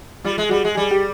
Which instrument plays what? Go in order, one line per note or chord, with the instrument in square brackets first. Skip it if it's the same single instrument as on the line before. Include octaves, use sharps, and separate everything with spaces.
[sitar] G3 [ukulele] F4
[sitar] G#3
[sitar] G3 [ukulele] F#4
[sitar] G#3
[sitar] G3 [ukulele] G#4
[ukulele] G4